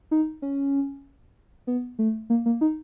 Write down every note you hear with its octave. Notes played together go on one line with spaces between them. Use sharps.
D#4
C#4
B3
A3
A#3
A#3
D#4